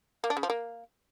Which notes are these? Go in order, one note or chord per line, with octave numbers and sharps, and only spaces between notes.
A#3
D4
C#3
F3
A#3